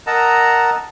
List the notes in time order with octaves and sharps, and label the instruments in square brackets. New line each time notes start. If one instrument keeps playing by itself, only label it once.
[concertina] A#4 D#5 F#5 A5 A#5 E6